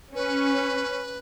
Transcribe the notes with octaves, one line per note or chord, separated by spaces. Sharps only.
C#4 B4